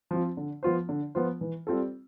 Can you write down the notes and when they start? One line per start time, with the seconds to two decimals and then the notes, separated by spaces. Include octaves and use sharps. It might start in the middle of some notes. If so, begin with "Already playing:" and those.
0.11 F3 C4 F4
0.37 D3
0.63 F3 B3 F4 C5
0.89 D3
1.15 F3 B3 F4 C5
1.41 E3
1.67 G3 C4 F4 A4